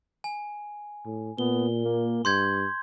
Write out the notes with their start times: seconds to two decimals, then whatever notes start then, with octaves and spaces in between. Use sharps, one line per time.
0.24 G#5
1.06 A2
1.38 A#2 B3 G7
1.84 A#3
2.25 G2 C6 G6 G#6